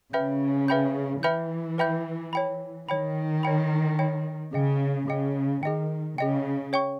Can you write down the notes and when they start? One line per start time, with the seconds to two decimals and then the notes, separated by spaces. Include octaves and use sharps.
0.13 C#3 B4 E5 G5 B5 G6
0.68 B4 E5 G5 B5 G6
1.23 E3 B4 E5 G5 B5 G6
1.78 B4 E5 G5 B5 G6
2.33 C#5 G5 B5
2.88 D#3 C#5 G5 B5
3.43 C#5 G5 B5
3.99 C#5 G5 B5
4.53 C#3 G#4 D#5 G5
5.08 C#3 G#4 D#5 G5
5.63 D#3 G#4 D#5 G5
6.18 C#3 G#4 D#5 G5
6.73 C#5 G5 C#6